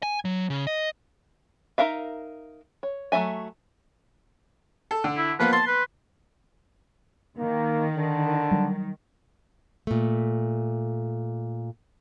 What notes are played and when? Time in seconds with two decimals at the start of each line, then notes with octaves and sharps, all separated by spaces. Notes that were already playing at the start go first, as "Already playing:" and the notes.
0.03 G#5
0.25 F#3
0.50 C#3
0.67 D#5
1.78 D#4 E4 A#4 E5 F5
2.83 C#5
3.12 F#3 A3 C#4 E5 G#5
4.91 A4
5.04 D3
5.18 E4
5.39 F3 A#3 B3 B4
5.53 A5 C6
5.67 B4
7.38 D#3 A#3
7.97 D3
8.51 F#3 G3
9.87 A#2 A3